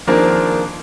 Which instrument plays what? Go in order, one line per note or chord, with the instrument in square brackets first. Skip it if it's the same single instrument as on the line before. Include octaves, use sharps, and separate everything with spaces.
[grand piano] D#3 F3 A#3 C4 D4 G#4